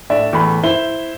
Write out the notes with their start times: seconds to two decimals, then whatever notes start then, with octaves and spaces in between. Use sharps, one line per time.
0.10 A2 D4 D5 E5
0.33 E2 A2 B5
0.63 E4 C5 E5 G7